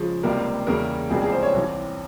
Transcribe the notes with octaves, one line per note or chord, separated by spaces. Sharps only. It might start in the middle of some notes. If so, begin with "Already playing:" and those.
Already playing: C#3 F3 G#3
C#2 C3 G3 A#3 A#4
E2 C#3 G3 A#3 A#4
C#2 C3 E3 G3 A#3 G#4
G#4
C5
C#5
C2 C3 E3